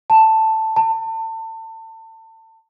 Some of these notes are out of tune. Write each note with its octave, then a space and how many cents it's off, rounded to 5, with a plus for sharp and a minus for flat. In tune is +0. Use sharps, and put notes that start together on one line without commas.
A5 +5
A5 +30